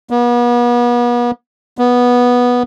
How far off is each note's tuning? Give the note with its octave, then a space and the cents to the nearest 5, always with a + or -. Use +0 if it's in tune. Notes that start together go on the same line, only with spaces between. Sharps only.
B3 -40
B3 -10